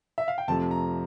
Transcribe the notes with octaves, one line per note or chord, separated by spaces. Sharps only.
E5
F5
G5
F2 C3 F3 A3 A5
A#5